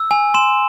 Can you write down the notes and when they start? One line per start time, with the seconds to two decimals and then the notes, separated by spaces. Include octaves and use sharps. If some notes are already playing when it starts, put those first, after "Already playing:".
Already playing: E6
0.11 G#5
0.34 C6 E7